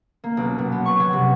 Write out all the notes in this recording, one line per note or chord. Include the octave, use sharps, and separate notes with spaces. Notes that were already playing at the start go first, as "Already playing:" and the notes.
A#3
B1
B2
B3
C#6
F#3
C3